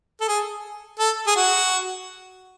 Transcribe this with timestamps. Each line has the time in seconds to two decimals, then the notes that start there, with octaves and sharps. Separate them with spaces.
0.21 A4
0.28 G#4
0.99 A4
1.27 G#4
1.36 F#4